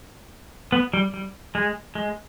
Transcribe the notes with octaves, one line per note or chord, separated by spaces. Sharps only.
B3
G3
G3
G#3
G#3